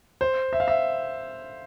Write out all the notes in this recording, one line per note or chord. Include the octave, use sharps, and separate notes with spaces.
C5
E5
F5
E5